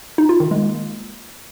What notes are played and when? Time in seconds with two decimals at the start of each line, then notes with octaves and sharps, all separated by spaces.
0.18 D#4
0.29 F4
0.40 D#3
0.51 G#3
0.62 A#3